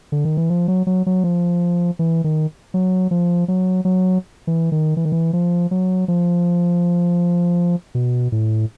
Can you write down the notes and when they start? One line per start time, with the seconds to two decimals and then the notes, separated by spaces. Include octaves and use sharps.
0.12 D3
0.25 D#3
0.37 E3
0.50 F3
0.68 F#3
0.87 F#3
1.06 F#3
1.24 F3
1.99 E3
2.24 D#3
2.74 F#3
3.11 F3
3.48 F#3
3.85 F#3
4.47 E3
4.72 D#3
4.97 E3
5.05 D#3
5.12 E3
5.33 F3
5.71 F#3
6.08 F3
7.95 B2
8.32 A2